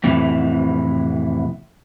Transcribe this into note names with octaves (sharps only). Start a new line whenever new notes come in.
F2 A2 C3 E3